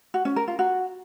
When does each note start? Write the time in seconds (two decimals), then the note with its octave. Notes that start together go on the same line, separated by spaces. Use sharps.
0.14 F#4
0.25 C#4
0.36 A#4
0.48 F4
0.59 F#4